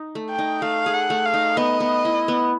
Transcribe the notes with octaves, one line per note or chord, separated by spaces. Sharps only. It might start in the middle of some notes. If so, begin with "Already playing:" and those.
Already playing: D#4
A3
G5
D#4
A3 F5
G#4
F#5
A3
F5
D#4
B3 D#5
B3
E4
B3